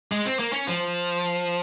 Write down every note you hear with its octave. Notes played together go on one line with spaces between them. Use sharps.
G#3
C4
A#3
C#4
F3